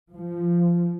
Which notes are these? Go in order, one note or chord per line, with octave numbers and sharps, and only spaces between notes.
F3